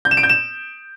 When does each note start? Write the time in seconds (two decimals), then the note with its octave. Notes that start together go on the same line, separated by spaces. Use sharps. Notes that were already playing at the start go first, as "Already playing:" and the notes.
0.05 G6
0.11 E7
0.17 D7
0.23 G6
0.29 E7